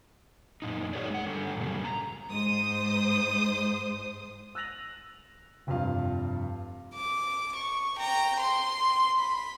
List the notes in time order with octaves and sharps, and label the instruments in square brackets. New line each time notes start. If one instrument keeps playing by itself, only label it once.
[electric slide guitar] F#2 A#2 D#4
D#4 F#4 G#4 A#4 C#5 D5
G#3 F#5
D3 G3 A4
F#2 A#2 C#3 F#3 G3
A#5
[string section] G#2 C5 D#6
[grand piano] E6 F#6 A6 A#6 F7 F#7
F1 G2 C3 F3 F4 F5
[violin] D6
C#6
G5 A#5
C6
B5